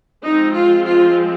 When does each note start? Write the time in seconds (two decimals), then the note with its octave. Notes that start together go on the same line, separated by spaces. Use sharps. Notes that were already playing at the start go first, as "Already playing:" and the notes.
0.24 F3 G#3 C4 D#4
0.54 F4
0.84 F4